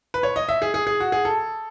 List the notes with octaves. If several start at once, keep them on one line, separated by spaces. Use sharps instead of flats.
B4
C#5
D#5
E5
G#4
G#4
G#4
F#4
G#4
A4